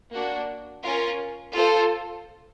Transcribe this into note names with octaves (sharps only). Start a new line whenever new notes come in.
A#3 D4 F#4
C#4 F4 A#4
F4 A4 C5